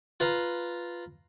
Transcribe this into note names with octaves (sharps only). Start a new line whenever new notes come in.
F4 B4 F5 A#5